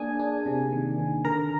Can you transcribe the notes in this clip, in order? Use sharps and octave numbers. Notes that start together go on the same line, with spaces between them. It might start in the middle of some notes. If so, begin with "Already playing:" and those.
Already playing: A#3 D4 G#4 G#5
D4
C3
D#3
D#3
D3 A#4 A#5